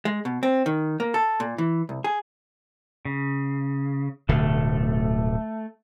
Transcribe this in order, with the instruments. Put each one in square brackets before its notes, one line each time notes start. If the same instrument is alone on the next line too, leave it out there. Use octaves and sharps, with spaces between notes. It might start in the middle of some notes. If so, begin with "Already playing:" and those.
[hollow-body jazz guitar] G#3
B2
C4
D#3
A#3
A4
A#2
E3
C2
G#4
[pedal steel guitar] C#3
[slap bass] D1 B2 D3 [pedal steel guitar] A3